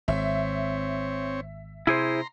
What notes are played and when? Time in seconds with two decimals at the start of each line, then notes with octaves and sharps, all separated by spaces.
0.08 G#1 C4 C#5 E5
1.87 C3 E4 G#4 C5 A#5 C6